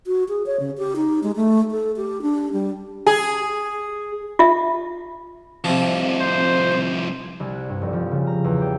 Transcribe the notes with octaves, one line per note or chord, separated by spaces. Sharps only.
F#4
G#4
C#5
C#3
G4
D#4
G#3
A3
A4
G4
D4
G3
G#4
F4 E5
C2 F2 C3 F3
C5
G#6
C2
F#6
G2
F1
F3
C#3
A#5
E2
G4